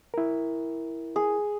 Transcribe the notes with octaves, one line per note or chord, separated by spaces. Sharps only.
E4 A#4
G#4